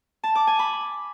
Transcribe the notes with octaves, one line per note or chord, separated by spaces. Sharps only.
A5
D6
G#5
B5